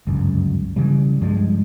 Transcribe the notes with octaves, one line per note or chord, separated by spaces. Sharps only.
G1 C#2 F#2
C#3 E3 G3
G2 F3 F#3 G#3